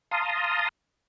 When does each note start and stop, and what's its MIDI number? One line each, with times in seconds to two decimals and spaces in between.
0.11 0.69 77
0.11 0.69 81
0.11 0.69 82
0.11 0.69 84
0.11 0.69 87